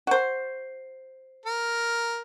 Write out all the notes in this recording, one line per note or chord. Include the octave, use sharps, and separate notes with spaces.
F#4 C5
A#4